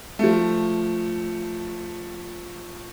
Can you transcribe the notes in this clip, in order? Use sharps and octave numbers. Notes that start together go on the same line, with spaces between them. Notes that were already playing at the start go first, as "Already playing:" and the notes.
F3 A3